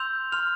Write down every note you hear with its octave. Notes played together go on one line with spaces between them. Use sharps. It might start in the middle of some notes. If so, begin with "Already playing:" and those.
Already playing: C6 E6 G6 F7
C6 F6 F7